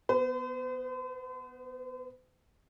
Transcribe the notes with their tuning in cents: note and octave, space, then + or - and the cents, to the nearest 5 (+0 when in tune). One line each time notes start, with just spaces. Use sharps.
B3 +0 C5 -45